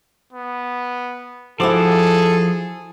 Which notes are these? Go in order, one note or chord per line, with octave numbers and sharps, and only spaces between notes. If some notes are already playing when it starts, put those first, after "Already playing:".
B3
F3 E4 F#4 G#4 A4 C5 D6